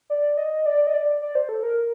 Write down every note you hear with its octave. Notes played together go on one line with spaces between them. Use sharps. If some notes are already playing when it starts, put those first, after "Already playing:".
D5
D#5
D5
D#5
D5
D5
C5
A4
A#4